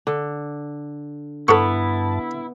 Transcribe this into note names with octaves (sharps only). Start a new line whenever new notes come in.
D3
G2 B3 E4 A4 A5 C#6